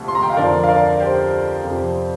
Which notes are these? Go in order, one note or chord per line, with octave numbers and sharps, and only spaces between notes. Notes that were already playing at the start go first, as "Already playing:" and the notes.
Already playing: D2 C3 F3
C6
A#5
G5
F5
F2 D3 F3 A#4 D5
F5
A#4 D5
G4 C5
F2 C3 F3